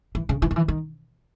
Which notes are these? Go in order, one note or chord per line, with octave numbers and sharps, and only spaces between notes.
E3
C#3
E3
D#3
E3
D#3